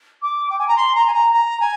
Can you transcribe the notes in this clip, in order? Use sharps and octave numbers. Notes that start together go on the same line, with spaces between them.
D6
G5
G#5
A#5
C6
A#5
G#5
A#5
A#5
G#5